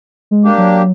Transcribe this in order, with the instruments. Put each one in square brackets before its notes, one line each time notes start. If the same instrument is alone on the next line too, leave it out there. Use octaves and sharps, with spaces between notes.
[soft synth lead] G#3
[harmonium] A#3 D4 G4
[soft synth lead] F#3